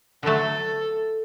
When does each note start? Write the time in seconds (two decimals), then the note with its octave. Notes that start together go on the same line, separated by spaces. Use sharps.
0.23 D3 F#3 A3 A4